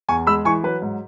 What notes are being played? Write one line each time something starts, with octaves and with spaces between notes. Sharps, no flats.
E2 G#5 C#6
G#3 B5 E6
E3 G#5 C#6
F#3 B4
G#2